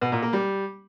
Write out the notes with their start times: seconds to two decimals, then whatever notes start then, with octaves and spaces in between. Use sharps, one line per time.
0.01 B2
0.12 A#2
0.22 A#3
0.33 G3